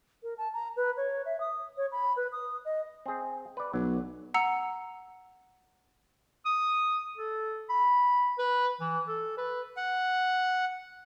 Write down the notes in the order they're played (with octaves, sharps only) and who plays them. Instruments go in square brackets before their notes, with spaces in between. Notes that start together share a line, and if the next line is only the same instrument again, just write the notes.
[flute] A#4
A5
A#5
B4
C#5
E5
D#6
C#5
B5
B4
D#6
D#5
[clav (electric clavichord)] C4 G#4
B4 D5
[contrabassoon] B1 [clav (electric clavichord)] F#3
[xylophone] F#5 A#5 E6 C#7 F7
[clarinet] D#6
A4
B5
B4
E3
A4
B4
[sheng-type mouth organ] F#5